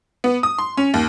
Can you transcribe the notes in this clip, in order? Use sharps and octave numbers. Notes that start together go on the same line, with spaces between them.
B3
D#6
C6
C#4
D#2